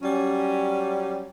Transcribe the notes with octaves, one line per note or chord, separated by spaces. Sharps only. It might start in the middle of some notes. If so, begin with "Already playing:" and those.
F#3 G3 C#4